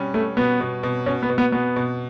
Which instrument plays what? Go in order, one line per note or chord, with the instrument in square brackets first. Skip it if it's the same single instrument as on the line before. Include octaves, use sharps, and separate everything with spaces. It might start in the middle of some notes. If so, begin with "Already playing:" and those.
Already playing: [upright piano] B2 G3 C#4
[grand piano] A3 [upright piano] C#4
[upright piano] B2 [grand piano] B3
[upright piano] B2
B2
[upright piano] B2 [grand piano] C#4
[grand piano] B3
[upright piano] B2
[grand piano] B3
[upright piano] B2 [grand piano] B3
[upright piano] B2